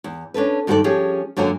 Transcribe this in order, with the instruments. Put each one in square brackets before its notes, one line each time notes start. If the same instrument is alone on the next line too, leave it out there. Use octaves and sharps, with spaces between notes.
[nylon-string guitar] E2
C#4 D4 A4 B4
G2 D#3 F#4 G#4 A4 D5
F3 C#4 G4 G#4
F#2 D3 F#3 A#3 A#4 G#5